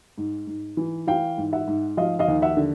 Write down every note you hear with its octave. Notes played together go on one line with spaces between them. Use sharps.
G#2
G#2
E3
E3 F5 G5
G#2
E5 F#5
G#2
F3 D#5 F5
D#5 F5
D#2
E5 F#5
D3